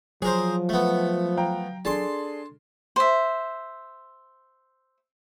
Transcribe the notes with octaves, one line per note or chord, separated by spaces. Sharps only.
F3 F#3 G#4 A#4 C5
A3 B3
F5 G5 A#5
D4 G#4 A4 A5 C6
C5 E5